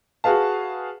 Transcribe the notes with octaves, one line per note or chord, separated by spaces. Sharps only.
F#4 G#4 B4 F5 A5